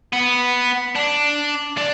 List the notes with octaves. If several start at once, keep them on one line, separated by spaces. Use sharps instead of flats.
B3
D4
D4